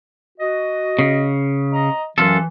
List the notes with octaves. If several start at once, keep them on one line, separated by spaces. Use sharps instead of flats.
F#4 D#5
C#3
D#5 A#5
F#2 E3 F4 A4